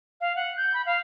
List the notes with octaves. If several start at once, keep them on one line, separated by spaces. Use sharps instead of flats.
F5
F#5
G6
B5
F5